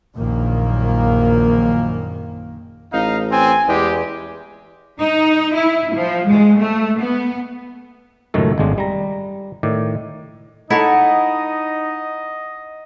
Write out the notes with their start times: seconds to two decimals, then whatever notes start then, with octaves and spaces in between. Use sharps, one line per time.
0.15 A#1 F#2 D#3 A#3
2.93 A1 D#4 F5
3.31 C4 G#5
3.68 E2 G#3 G4
5.00 D#4
5.56 E4
5.95 F3
6.27 G#3
6.57 A3
7.00 B3
8.34 C#2 F#2 A2 D#3 A3 A4
8.58 G#1 A2 G#3 D4
8.78 G3 A#5
9.63 A2 D#3 D5
10.70 D#4 E4 A4 C#5 D#5 F#5